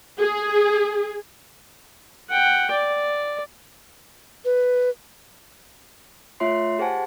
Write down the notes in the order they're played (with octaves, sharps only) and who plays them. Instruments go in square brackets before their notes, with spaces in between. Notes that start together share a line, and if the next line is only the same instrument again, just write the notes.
[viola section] G#4
[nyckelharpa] F#5 G5
D5
[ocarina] B4
[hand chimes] A3 F4 C#5 E5 C6 C7
G4 G#4 C5 F#5 G#5 A5